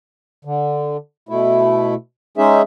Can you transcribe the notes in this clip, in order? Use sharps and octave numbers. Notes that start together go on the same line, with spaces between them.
D3
B2 A3 E4
G#3 C#4 D#4 G#4 E5